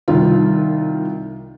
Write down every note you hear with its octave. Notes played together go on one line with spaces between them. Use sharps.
C2 D#3 F4